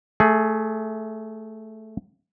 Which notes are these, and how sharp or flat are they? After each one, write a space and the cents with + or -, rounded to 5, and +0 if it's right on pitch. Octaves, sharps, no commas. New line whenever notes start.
A3 -5 G#4 +20